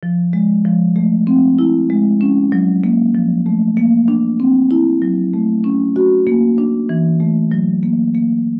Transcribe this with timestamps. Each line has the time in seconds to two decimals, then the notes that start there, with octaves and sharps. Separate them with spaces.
0.03 F3
0.33 G#3
0.65 F3
0.96 A3
1.27 C4
1.59 E4
1.90 G#3
2.21 C#4
2.52 F#3
2.84 A#3
3.15 F3
3.46 A3
3.77 A#3
4.08 D4
4.40 C4
4.71 E4
5.02 F#3
5.34 A3
5.64 C#4
5.96 F#4
6.27 A#3
6.58 D4
6.89 E3
7.20 A3
7.52 F#3
7.83 A#3
8.15 A#3